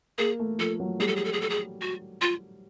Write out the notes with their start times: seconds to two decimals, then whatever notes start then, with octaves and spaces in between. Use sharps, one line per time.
0.18 A#3 G#4
0.39 A3
0.59 F3 A4
0.80 F#3
1.00 G3 G#4
1.08 A4
1.16 G#4
1.25 A4
1.33 G#4
1.41 A4
1.50 G#4
1.81 F#4
2.21 F4